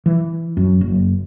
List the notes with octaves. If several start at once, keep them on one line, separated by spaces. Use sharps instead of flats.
E3
F#2
F#1